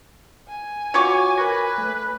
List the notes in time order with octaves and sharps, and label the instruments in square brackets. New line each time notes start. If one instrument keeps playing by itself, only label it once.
[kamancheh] G#5
[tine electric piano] F4 F#4 [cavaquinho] C#5 D6 [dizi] C#6
[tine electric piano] A#4 G#6 A#6 [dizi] B4
[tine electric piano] A3